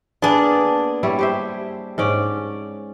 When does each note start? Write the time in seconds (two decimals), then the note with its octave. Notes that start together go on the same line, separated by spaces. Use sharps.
0.22 A#3 B3 D4 G#4
1.03 G3 E4 C#5
1.19 G4 C5 E5
1.98 G#2 C#4 D5